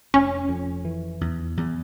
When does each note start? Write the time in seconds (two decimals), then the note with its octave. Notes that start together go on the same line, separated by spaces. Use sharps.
0.13 F1 C#4
0.49 F2
0.85 E3
1.21 E2
1.57 E2